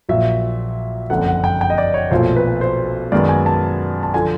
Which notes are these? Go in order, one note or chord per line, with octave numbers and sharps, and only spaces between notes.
A#1 A#2 F#3 E5
F#1 F2 D3 F#5
F#5
G5
G5
D#5
D5
C#5
B1 A#2 F3 A3 C5
B4
C5
F#2 D#3 G#3 B3 D5
G#5
A5
A5
D3 F3 G#5